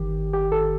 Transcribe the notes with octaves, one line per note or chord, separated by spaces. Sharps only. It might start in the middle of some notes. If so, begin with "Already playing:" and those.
Already playing: G1 D#3 G4
G4
A4